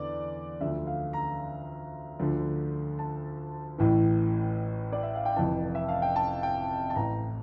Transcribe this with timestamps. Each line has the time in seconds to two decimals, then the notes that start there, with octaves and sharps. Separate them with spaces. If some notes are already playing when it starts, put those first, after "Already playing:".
Already playing: E2 D3 D5
0.61 D2 D3 F3 E5
0.87 F5
1.13 A#5
2.19 D2 D3 F3
2.99 A5
3.78 A1 A2 E3
4.93 D5
5.03 E5
5.15 F5
5.25 G5
5.36 F1 F2 E3 A5
5.75 E5
5.88 F5
6.02 G5
6.16 A5
6.43 G5
6.90 A5
6.96 A1 A2 E3 A#5